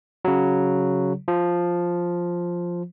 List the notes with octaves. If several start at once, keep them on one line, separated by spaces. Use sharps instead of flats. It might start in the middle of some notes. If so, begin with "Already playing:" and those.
C#3 F#3
F3